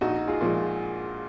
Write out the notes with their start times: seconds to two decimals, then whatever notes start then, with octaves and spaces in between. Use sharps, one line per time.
0.01 A#1 D#4 F#4
0.27 F4 G#4
0.41 A#2 F3 G#3